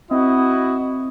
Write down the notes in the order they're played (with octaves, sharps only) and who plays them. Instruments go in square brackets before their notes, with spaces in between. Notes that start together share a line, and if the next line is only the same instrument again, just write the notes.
[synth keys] C4 [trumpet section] E4 F#4 D#5